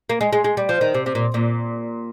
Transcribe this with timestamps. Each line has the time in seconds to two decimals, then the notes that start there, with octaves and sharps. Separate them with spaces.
0.10 A#3
0.21 G#3
0.33 G#3
0.44 G#3
0.57 G3
0.69 F3
0.81 D#3
0.94 C3
1.06 C3
1.15 A#2
1.34 A#2